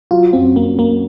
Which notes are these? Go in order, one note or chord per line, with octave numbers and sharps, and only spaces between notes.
F#3 F4
F#2 C4
A#3 C4
A#3 C4